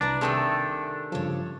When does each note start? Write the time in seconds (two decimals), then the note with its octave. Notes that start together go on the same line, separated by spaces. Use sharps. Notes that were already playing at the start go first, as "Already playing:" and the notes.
0.01 C2 D4 E4 B4 A#5 D6
0.21 C3 D#3 A3 G#4 A4 G5
1.12 G2 C#3 F3 A4 C#5